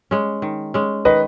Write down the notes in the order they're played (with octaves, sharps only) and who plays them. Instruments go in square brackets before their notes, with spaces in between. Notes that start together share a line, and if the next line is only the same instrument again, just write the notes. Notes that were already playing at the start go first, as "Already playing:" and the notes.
[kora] G#3 C#4
D#3
G#3 C#4
[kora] D#3 [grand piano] B4 D#5